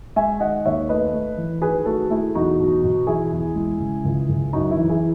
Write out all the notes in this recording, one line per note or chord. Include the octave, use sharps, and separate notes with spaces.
G#3 E5 G#5
D#3 D#5 F#5
D#2 C#5 E5
A3 B4 D#5
A3
E3
D#3 G#4 B4
A3 F#4 A4
A3 E4 G#4
E1 D#4 F#4
B2
B2
E3 E4 G#4
E2
G#3
C#3
C#2
C#2
F#2 D#4 F#4
E4
E3
E4 G#4